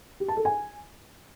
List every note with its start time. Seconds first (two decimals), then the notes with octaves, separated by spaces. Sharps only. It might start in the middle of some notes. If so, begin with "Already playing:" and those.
0.20 G4
0.28 A5
0.37 A4
0.45 G#5